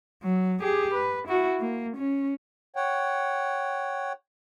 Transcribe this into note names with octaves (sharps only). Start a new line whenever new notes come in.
F#3
G4 G#4
B4
E4 F#4
A#3
C#4
C#5 F#5 G5